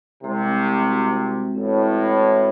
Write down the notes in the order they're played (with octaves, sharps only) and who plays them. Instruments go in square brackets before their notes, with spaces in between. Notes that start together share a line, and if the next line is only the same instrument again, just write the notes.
[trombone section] C2 C3 [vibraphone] G#3
[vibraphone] C4
C4
F#4
C5
G#3
[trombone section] A1 A2 [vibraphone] C4
[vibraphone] C5
C5
F#4